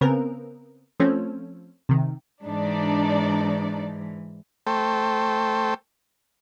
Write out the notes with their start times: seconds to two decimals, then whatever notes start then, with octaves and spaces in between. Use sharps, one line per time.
0.01 C#3 B3 C4 A#4
1.00 F3 A3 C4 C#4
1.89 C3 D#3
2.44 G#2 E3 D4 D#4 D5
4.67 A3 A4 C5 G5